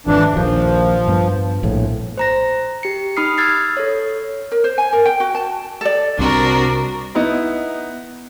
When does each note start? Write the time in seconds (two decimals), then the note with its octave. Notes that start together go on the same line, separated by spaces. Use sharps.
0.07 G#1 F2 E3 D4
0.34 A#1 D#2 F3
1.08 G2 B3
1.63 A#1 A2
2.18 C5 A#5 A#6
2.83 G4 C#7
3.16 D#4 B5 D#6 F6 C7
3.38 E6 F6 G#6 A6 C7
3.77 A4 C#5
4.52 A#4
4.64 C5
4.78 G#5
4.93 A#4
5.05 G5
5.20 F#4
5.35 A5
5.81 A4 D5
6.19 C2 C3 D4 F#4 A#4
7.15 B3 D#4 E4